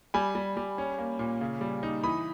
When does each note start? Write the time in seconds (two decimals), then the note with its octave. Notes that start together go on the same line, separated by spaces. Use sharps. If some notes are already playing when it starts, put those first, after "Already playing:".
0.14 G3 G#5 B5
0.35 G3
0.57 G3
0.78 C#4
0.98 A#3
1.19 A#2
1.41 C#3
1.61 G3
1.83 D#4
2.03 E3 B5 D#6